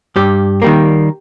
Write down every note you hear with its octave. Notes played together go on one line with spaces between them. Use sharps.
G2 G4
D#3 G3 A#3